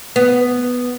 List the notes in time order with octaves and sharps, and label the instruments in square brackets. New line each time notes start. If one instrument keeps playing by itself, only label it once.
[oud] B3